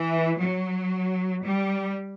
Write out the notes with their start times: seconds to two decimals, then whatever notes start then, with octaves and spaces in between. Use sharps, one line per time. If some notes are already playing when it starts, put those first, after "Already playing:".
Already playing: E3
0.38 F#3
1.44 G3